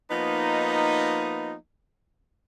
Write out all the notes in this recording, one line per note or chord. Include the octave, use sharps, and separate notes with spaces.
F3 A#3 B3 D#4